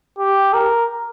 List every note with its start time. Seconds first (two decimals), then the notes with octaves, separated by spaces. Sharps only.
0.19 G4
0.53 A#4